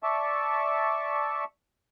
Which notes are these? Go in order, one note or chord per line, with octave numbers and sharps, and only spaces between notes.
D5 E5 A5 C#6